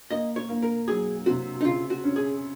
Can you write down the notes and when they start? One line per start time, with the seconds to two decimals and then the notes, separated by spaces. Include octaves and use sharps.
0.11 A#3 D#5
0.36 C#5
0.49 A#3
0.62 A#4
0.88 F#3 G#4
1.26 C3 F#4
1.61 D#4
1.64 C#3 F4
1.90 F#4
2.04 C#4
2.16 G#4